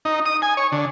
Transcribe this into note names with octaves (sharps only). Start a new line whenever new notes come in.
D#4
D#6
G#5
C#5
D3